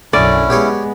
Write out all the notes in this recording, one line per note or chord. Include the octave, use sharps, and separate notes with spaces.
B1 F#2 D3 C#4 E4 D5
G#3 B3 G4 G#4 C#5